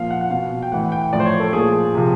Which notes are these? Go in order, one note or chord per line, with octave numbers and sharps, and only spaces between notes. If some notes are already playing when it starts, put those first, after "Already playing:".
Already playing: A#2 F3 F5
F#5
F#5
B2 F5
G5
A2 E3 F#5
G5
A2 F3 D5
C5
C#5
A4
A#2 F3 G#4
C3 F3